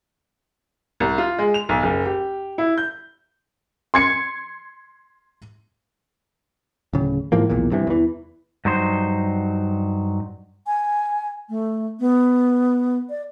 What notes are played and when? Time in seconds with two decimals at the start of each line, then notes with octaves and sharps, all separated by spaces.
1.00 C2
1.18 F4
1.39 G#3
1.54 F7
1.69 B1
1.83 F#1
2.05 G4
2.58 E4
2.78 G6
3.94 C6 G#6 C#7
6.93 D1 C#3
7.32 G#2 E3 F3 A#3
7.49 B1 E2 A#2
7.72 G2 C3 E3
7.87 E2 E3
8.65 G2 F#3 D#4 C5
10.67 G#5
11.49 A3
12.00 B3
13.10 D5